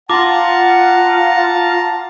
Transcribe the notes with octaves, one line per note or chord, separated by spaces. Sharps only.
F4 F#5 A5 A#5 C6 D6